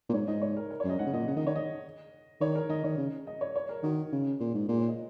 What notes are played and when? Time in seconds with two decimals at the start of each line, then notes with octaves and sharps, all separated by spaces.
0.09 A#2
0.13 G#2 C#5
0.28 G#2 D#5
0.42 C#5
0.57 A#4
0.71 A#4
0.80 C#5
0.85 F#2 D#5
0.99 G#2 F#5
1.06 C#3
1.13 A#2 D#5
1.27 C#3 F#5
1.36 D#3 D#5
1.47 D#3 C#5
1.56 D#5
2.41 D#3 C#5
2.55 A#4
2.69 D#3 D#5
2.84 D#3 C#5
2.98 C#3
3.27 D#5
3.41 C#5
3.56 C#5
3.69 A#4
3.83 D#3 F#4
4.12 C#3
4.40 A#2
4.54 G#2
4.69 A#2 G#4
4.78 C#5
4.88 D#5